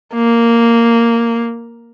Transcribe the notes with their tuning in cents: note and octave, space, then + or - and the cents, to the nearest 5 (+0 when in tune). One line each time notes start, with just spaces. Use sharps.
A#3 -5